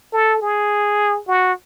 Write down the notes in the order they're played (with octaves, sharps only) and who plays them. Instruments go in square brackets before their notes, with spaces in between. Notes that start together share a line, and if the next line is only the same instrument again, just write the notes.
[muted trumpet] A4
G#4
F#4